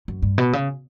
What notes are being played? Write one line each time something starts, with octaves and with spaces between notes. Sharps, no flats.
F#2
G2
B2
C#3